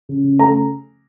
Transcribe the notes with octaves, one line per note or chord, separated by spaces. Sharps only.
C#3
C#3
A3 A#5